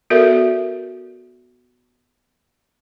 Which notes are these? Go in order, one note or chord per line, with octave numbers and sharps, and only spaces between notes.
B3 F#4 A4 A#4 D5 E5